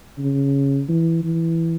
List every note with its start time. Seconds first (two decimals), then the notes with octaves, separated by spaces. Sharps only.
0.18 C#3
0.89 E3
1.23 E3